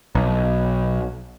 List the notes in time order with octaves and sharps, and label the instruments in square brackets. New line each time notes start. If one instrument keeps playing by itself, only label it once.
[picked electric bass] B1